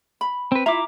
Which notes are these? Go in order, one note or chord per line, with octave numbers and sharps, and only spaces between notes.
B5
C4 B4
E4 F4 E5 A#5 D6